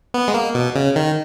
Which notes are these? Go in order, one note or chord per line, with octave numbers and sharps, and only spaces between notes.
B3
G#3
A#3
B2
C#3
D#3